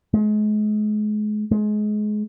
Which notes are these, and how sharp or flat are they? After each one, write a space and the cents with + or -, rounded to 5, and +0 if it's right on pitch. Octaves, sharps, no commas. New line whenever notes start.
G#3 +35
G#3 +25